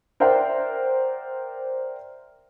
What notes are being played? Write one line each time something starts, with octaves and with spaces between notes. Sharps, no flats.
A#4 C5 D5 E5 F#5 G5